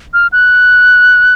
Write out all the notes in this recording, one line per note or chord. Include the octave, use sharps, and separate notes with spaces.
F6
F#6